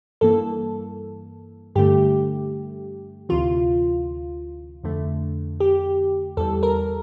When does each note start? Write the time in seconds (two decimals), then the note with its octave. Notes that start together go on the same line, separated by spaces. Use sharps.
0.21 G2 E3 A#3 A4
1.75 G2 D3 A3 G4
3.29 D2 C3 E3 F4
4.83 F2 D3 A3
5.60 G4
6.37 E2 E3 G3 A4
6.63 A#4